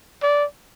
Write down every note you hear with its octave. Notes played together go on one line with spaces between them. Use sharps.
D5